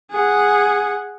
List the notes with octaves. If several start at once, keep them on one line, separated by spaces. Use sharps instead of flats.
G#4 F#5